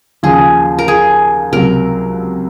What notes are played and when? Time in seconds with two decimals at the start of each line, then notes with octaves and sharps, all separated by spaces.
0.23 D#2 C#3 F3 G#4
0.79 A#4
0.88 G#4
1.52 C#2 C3 F#3 A#4